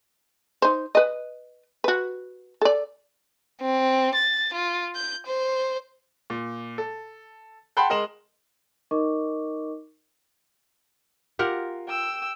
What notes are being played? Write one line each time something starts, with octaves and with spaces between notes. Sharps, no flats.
D#4 C5
B4 D#5
F#4 B4
A4 D5
C4
A6
F4
G6
C5
A#2
A4
F#5 G5 A5 B5 C6
G#3 A#4 D#5 C6 E7 F#7
D#4 A#4 D#5 C#6 D6
F4 G4 A#4 F#5
G5 E6